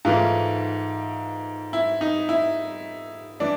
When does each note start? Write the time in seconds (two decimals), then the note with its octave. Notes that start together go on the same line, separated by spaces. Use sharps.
0.05 G#2 E3 A3 F4
1.73 E4
2.01 D#4
2.29 E4
3.40 E3 D4